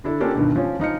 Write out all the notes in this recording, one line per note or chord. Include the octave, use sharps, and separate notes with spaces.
D3 D4 E4 A4
A#3 C#4 D4 F4 G4 A4
D2 G2 B2 D3 D#3
F3 C#4 C#5
F3 D#4 F6 C#7